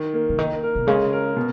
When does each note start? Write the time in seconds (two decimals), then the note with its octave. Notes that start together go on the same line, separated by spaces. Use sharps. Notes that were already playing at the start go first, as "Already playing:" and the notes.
Already playing: D#3
0.13 A#3
0.29 C#3
0.38 D#3 A#3
0.63 A#4
0.75 B2
0.87 C#3 G#3
1.13 A#4
1.36 B2